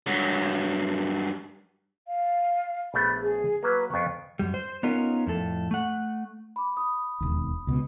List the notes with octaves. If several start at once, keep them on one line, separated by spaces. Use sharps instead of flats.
G2 F#3
F5
A#1 A3 B3 B5
G#4
F#3 A#3 B4
F2 B3 C#6
F#2 G3
C5
B3 C#4 D#4 F4 A#4
F2 A2 A4
A3 F#5
B5 D6
B5 D#6
E1 D#2
C#2 B2